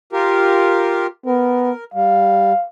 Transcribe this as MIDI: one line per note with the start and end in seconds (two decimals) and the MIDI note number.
0.13 1.07 65
0.13 1.07 67
0.13 1.07 70
1.26 1.72 59
1.26 1.84 70
1.94 2.52 55
1.94 2.66 77